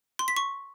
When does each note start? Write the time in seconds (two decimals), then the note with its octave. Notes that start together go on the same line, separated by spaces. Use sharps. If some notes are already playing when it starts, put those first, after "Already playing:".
0.19 C6
0.28 B6
0.37 C#6